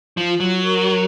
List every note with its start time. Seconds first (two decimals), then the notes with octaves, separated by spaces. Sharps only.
0.17 F3
0.28 F4
0.40 F#3
0.63 A#4